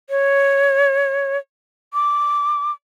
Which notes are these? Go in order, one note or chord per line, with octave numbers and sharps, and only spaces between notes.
C#5
D6